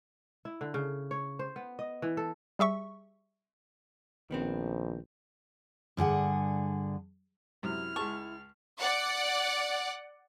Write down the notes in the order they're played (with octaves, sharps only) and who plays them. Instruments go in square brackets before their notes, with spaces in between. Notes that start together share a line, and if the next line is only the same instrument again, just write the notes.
[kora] E4
D3
C#3
C#5
C5
B3
D#5
E3
A4
[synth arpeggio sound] G3 G#4 E5 C#6
[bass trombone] A#1 [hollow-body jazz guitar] D#3 B3 C4
[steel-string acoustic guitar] G2 D3 G#4 F#5
[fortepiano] F#2 C3 [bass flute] E4 [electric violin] F6
[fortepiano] C#2 G#3 A5 [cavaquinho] C#6
[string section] D5 F#5